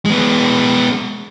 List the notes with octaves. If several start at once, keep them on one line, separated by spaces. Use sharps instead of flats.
G#3 B3